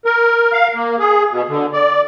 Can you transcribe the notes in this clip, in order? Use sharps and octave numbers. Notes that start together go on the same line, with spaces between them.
A#4
F5
A#3
G#4
B2
D3
D5